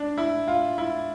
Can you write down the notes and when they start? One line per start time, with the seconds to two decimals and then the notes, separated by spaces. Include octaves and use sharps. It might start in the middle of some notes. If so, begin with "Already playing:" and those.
Already playing: D4
0.18 E4
0.48 F4
0.78 E4